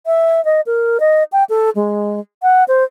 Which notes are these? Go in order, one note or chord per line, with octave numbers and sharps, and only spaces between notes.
E5
D#5
A#4
D#5
G5
A4
G#3
F#5
C5